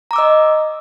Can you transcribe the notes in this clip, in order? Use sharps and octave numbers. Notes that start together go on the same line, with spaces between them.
D#5 A#5 D6 E6